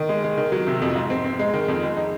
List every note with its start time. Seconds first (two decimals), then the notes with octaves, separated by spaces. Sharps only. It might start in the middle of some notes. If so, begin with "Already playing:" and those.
Already playing: D#3
0.09 G#3
0.24 G#3
0.38 D#3
0.52 F#3
0.67 C3
0.82 F2
0.95 G#2
1.10 C4
1.25 C4
1.39 G#3
1.54 D#3
1.68 F2
1.83 G#3
1.97 D#4